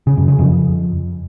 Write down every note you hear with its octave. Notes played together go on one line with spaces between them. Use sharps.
C#3
F#2
C#3
F2